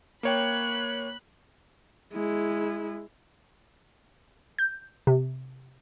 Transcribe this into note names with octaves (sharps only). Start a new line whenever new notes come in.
A#3 C#5 G5 B5 F#6
G#3 E4
G6
C3